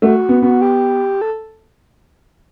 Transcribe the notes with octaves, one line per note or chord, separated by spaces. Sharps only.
A3 F#4
B3
B3 F#4
G4
A4